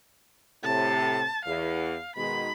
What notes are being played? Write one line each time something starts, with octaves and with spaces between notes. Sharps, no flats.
A2 C3 A5
E2 F5
B2 D#3 G#3 B5